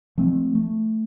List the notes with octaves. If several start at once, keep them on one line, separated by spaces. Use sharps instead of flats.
F3 A3 C4
A3